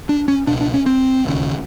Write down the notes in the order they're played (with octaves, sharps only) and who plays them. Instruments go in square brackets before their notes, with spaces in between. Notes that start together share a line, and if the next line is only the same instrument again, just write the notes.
[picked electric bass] D4
C#4
C#2 B2 D4
D4
C#4
C4
E1 D#2 C#3